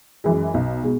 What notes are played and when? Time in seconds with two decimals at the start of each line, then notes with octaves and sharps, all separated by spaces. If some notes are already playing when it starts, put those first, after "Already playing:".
0.24 F#2 E3 G#3
0.54 B1
0.84 B2 G#3